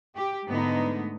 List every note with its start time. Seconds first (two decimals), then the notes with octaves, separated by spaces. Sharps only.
0.15 G4
0.47 G#2 D3 A3 B3 D#4